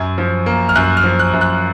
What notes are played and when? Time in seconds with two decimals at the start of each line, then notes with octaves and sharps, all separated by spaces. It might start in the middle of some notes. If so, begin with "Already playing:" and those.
Already playing: F#2 G#6
0.18 F3
0.46 A#3
0.69 F6
0.75 F#2 F#6
0.97 F6
1.04 F3
1.19 F#6
1.33 F#2
1.41 F#6